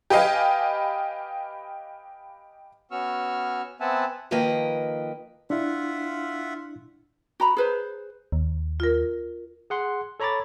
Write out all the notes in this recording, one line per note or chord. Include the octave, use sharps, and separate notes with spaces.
G4 B4 D#5 F5 G#5
B3 C#4 F#4 C#6 E6 F6
B3 C4 E5 F#5 G#5 A5
D#3 F3 A#3 B4 D#5 G5
D4 E4 F4 E5 F#5
F#4 A#5 B5
G#4 B4 C5
D#2
F4 A#4
G#4 F#5 C6
A4 C#5 A#5 B5 D6 A6